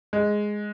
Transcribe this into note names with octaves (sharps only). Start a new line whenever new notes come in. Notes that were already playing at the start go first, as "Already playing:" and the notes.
G#3